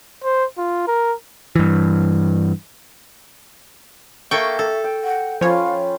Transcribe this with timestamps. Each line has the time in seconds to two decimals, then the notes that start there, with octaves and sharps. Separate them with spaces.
0.24 C5
0.58 F4
0.87 A#4
1.56 G2 E3
4.31 A#3 A4 E5 G5 C#6
4.59 A4
4.84 G5
5.04 F#5
5.41 F3 C#4 F4 B4 C#5 F5